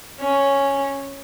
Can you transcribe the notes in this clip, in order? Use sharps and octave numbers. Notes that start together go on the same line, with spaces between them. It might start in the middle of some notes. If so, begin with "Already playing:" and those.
C#4